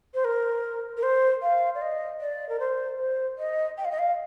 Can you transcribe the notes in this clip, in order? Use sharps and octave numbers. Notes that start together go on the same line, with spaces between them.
C5
A#4
A#4
C5
F5
D5
D#5
D5
A#4
C5
C5
D#5
G5
F5
D#5
F5